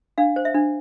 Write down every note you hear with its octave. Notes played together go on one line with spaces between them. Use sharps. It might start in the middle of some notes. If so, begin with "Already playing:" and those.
D4 F5
C5
E5
D4